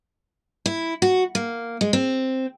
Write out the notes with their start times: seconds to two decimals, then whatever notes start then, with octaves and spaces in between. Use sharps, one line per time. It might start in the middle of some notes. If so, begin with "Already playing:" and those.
0.66 E4
1.02 F#4
1.35 A#3
1.81 G#3
1.93 C4